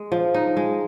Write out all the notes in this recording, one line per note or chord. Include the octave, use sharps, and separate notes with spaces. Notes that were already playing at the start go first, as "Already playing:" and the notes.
Already playing: G#3
F3
D#4
G#3